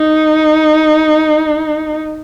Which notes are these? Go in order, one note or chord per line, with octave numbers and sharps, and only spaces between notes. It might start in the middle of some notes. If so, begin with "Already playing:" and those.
Already playing: D#4